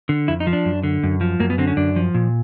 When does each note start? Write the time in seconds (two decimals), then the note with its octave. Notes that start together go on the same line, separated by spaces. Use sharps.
0.09 D3
0.28 F2 E4
0.40 D#4
0.47 F3
0.53 D4
0.65 F#2
0.83 D3
1.03 F#2
1.21 F3
1.40 F#2 A#3
1.50 B3
1.58 D3 C4
1.67 C#4
1.77 F#2 D4
1.96 F3
2.14 A#2